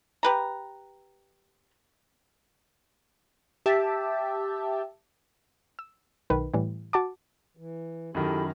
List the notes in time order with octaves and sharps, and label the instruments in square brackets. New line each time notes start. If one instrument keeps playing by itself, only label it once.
[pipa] G4 B4 A#5
[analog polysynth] G4 E5 A5
[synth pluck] E6
B1 D#3 B4
A2 E3 G3
F#4 A5 D6
[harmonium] E3
[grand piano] F#2 D#3 [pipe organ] E4 B5 [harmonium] G4 A4